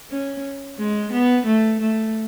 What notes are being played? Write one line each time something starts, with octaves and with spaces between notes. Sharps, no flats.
C#4
G#3
B3
A3
A3